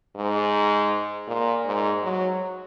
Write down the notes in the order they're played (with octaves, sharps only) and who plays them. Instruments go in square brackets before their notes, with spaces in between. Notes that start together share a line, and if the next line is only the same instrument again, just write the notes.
[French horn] G#2
A#2
G#2
F#3